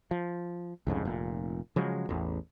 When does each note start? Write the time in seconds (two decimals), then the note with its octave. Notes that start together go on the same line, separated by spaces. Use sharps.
0.11 F3
0.87 C2 F2 G#2 C#3
1.05 F1 A#2
1.76 C#3 F3 F#3 G#3
2.09 A1 E2